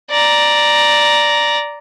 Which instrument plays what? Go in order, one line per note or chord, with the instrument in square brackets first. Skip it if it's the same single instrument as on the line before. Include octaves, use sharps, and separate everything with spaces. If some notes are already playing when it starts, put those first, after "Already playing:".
[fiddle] D5 A#5